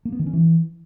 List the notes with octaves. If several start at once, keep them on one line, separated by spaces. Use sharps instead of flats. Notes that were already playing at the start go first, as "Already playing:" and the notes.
A#3
B3
D#3
C#4
E3